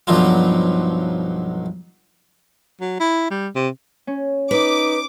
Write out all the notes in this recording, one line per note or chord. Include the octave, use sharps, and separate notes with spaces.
B1 G2 F3 F#3 F4
F#3
E4
G3
C3
C#4
D#4 B4 D6